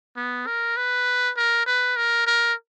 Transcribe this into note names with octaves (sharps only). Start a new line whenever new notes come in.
B3
A#4
B4
A#4
B4
A#4
A#4